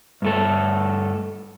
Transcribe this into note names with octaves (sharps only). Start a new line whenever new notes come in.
G2 A3 A4